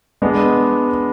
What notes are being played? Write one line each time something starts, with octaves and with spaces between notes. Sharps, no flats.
G#3 B3 D4